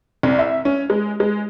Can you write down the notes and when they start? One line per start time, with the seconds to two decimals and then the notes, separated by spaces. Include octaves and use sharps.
0.23 C2
0.39 E5
0.65 C#4
0.90 G#3
1.20 G#3